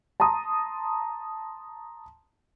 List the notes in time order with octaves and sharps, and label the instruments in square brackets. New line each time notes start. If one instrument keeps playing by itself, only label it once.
[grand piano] A5 A#5 C6 D#6